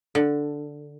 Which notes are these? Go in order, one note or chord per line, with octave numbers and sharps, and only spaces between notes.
D3